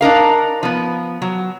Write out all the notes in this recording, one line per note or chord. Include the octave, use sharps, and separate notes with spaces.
D4 D#4 A#4 F5
F3 B3
F#3